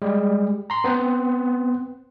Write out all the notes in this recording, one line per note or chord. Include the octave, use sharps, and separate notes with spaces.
G3 G#3 G4
A#5 C6
B3 C4 C5 F#5